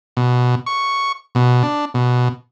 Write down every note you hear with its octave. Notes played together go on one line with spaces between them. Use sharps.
B2
C#6
B2
D4
B2